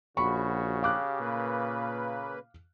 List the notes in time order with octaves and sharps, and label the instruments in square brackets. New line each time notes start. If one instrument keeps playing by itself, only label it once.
[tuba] A#1 [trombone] C#3 [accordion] F#4 [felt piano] B5 C#6
[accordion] G4 [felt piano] F5 D6 F#6
[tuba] A#2 [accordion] A#3 B4